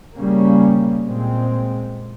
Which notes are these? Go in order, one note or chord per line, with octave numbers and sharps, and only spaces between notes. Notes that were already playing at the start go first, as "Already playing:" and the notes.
C#3 G3 A#3 C#4
A#2 G#3 C4